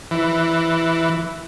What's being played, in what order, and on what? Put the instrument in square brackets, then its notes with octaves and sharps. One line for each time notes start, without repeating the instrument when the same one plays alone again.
[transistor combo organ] E3